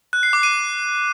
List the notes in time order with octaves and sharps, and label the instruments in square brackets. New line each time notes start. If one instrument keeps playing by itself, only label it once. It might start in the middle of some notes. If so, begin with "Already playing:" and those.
[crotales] F#6
C7
D6
D#7